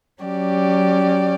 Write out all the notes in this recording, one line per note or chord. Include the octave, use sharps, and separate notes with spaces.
F#3 C#4 G4 D5